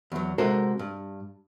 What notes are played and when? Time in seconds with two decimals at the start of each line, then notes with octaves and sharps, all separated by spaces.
0.12 E2 F#3
0.38 C3 G#3 F#4 A4 A#4 C5
0.79 G2